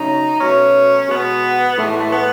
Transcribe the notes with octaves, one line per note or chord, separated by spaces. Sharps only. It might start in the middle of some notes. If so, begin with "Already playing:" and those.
Already playing: C#3 F#3 A3 D#4
B2 F#3 A3 C#4
B2 G#3 B3
A2 E3 G#3 A3
A3
B3